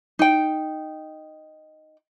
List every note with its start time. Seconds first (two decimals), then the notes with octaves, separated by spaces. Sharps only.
0.19 D#4 G5